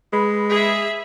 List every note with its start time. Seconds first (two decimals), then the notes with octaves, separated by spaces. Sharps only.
0.13 G#3 B4 B5
0.50 G#4 E5